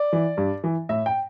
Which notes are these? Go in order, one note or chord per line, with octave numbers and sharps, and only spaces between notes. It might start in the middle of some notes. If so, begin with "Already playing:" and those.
Already playing: D5
E3
G2
E3
A2 E5
G5